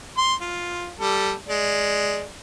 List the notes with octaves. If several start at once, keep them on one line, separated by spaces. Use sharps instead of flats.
C6
F4
G3 A4
G#3 D5